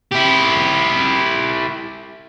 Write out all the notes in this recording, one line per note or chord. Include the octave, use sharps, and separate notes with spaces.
E4 G4